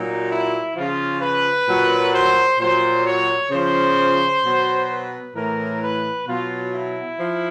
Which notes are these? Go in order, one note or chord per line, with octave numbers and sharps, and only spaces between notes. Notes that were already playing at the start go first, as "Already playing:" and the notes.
Already playing: A#2 F#3 D#4
E4
C#3 F3 F4
B4
A#2 F#3
C5
A#2 F#3 C5
C#5
C#3 F3 C5
B2 F#3
B4
A2 E3 A#4
B4
B2 F#3 F4
E4
F3